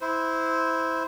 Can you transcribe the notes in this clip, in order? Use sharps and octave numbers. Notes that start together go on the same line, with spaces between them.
E4 C5